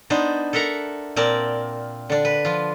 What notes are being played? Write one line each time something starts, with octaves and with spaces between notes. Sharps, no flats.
B3 D4 D#4 C5
A4 A#4 E5 F#5 A#5
A#2 C4 A#4 D5 A5
D3 D4
B4
F3 F4